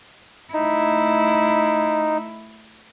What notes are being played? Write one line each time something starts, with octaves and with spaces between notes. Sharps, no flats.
A3 D#4 E4